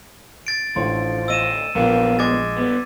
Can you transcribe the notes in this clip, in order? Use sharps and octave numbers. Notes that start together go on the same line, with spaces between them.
A6 D7
A1 D3 F3 C#5 C6
D2 D#5 E6 D#7 E7
A#1 F#2 G3 A#3 B3 C#7
G#3 D6 G#6 A6
G3 B3